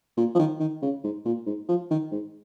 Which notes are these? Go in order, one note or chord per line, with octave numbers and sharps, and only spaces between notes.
A#2
F3
D#3
D#3
C#3
G#2
A#2
G#2
F3
D#3
G#2